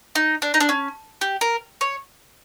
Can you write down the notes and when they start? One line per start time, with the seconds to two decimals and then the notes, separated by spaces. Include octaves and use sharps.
0.15 D#4
0.42 D4
0.54 D#4
0.60 D4
0.69 C#4
1.21 G4
1.41 A#4
1.81 C#5